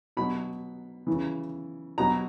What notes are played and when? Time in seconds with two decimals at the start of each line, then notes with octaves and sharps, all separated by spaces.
0.17 B2 F#3 B5
1.07 C#3 E3
1.98 B2 F#3 A#5